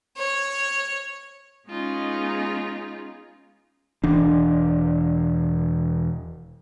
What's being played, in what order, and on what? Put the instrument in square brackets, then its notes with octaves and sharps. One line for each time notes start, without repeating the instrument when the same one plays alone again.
[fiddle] C#5
[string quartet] G#3 B3 C#4 D#4 F4 G#4
[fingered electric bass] E1 E3 D4